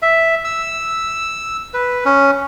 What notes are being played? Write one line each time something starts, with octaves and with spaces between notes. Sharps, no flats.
E5
E6
B4
C#4